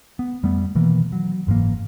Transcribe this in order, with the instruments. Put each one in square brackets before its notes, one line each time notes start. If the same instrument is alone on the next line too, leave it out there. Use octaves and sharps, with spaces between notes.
[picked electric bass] B3
F2 G3 A3 B3
B2 D#3 E3 A#3
F#3
F#1 G#2 E3 A#3